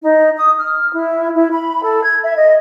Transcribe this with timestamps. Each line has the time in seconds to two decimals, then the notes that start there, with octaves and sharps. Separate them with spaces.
0.02 D#4
0.37 D#6
0.59 F6
0.93 E4
1.34 E4
1.52 B5
1.83 A4
2.03 G#6
2.24 E5
2.36 D#5